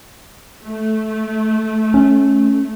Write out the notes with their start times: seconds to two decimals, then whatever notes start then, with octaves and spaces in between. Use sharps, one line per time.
0.66 A3
1.94 C#4